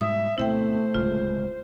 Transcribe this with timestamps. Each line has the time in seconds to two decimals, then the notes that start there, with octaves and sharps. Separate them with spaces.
0.01 G#2 B2 G3 E5 D#6
0.38 D2 B2 A3 C4 E4 C5 E5 G5
0.94 D1 C#2 G#3 F4